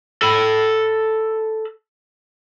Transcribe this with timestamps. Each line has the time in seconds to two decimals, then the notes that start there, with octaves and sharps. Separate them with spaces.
0.22 A4 B5